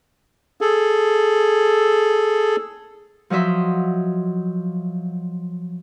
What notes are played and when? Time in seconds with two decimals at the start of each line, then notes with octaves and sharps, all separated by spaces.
0.61 G#4 A4
3.30 F3 F#3 D#5 E5 C6